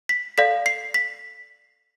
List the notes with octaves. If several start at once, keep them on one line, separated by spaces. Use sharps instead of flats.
B6
A4 D5 F5 B6
C7
B6